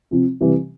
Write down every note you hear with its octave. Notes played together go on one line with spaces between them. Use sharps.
C3 F3 C4
C3 E3 G3